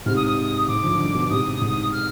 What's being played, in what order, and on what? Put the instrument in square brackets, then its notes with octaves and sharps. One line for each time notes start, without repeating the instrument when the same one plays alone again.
[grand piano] G#2 C3 [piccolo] F6
[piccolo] D#6
D#6
[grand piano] G#2 [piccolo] D6
[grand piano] D3 F3
D3 F3
B2 D3
[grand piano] G#2 C3 [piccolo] D#6
[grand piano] G#2
[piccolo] F6